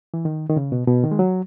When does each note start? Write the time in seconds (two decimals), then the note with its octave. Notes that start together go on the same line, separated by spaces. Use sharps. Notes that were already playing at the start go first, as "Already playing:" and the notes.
0.14 E3
0.25 D#3
0.49 D#3
0.57 C#3
0.72 B2
0.87 B2
1.04 D#3
1.12 G#3
1.19 F#3